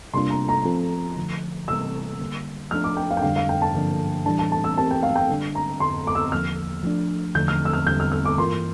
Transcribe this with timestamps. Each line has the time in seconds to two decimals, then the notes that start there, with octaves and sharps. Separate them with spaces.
0.14 C3 G3 A#3 D4 F4 C6
0.30 A#5
0.49 A#5
0.65 F3 C4 F4 A4
1.16 D3 F3 A3
1.68 C3 E3 G3 A#3 E6
2.20 D3 G3 A#3
2.71 F3 A3 D4 F6
2.84 D6
2.97 G5
3.10 F5
3.17 G5
3.22 F2 D3 G3 D4 F5
3.36 F5
3.49 G5
3.62 A5
3.74 G2 D3 F3 A#3 D4
4.26 A2 E3 G3 D4 A5
4.39 A5
4.52 A5
4.64 E6
4.77 E3 A3 C4 G4 A#4 A5
4.91 G5
5.03 F5
5.16 G5
5.29 D3 G3 D4
5.55 A#5
5.80 F2 D3 A3 C6
6.07 D6
6.15 E6
6.32 E2 D3 F3 A#3 F6
6.83 F3 A3 D4
7.35 E2 D3 F3 A3 D4 G6
7.48 F6
7.65 E6
7.73 F6
7.86 E2 D3 G3 G6
8.00 F6
8.12 F6
8.25 D6
8.38 G2 E3 A#3 F4 A#4 C6